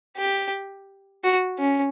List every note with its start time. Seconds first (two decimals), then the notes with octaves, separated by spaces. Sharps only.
0.17 G4
1.24 F#4
1.59 C#4